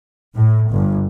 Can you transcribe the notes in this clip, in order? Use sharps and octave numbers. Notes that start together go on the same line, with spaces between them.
A2
G1